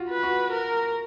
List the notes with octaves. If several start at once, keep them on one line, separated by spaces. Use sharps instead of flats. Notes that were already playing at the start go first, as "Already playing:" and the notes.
Already playing: F4 F#4
B4
F#4
A#4